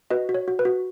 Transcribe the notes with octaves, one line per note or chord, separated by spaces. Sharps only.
F#4 B4 D#5
F#4
C#5
F#4
B4
F#4